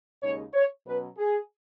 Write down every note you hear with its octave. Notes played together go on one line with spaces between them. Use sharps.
D#2 C#3 G#3 D#4 C#5
C#5
B2 F#3 C#4 B4
G#4